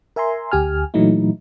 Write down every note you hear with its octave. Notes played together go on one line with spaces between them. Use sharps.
A#4 E5 G#5 A#5 C6
D2 G4 G#5 F6
A#2 E3 F#3 A3 D#4 E4